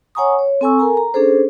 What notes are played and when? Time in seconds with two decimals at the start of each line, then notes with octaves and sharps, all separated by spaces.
0.15 C#5 F#5 G#5 A#5 C#6 D#6
0.39 C#5
0.61 C4 A4 G#5 C#6 E6
0.79 A4 A#4 G#5 A#5
0.97 A#5
1.14 C#4 D4 G#4 A4 C5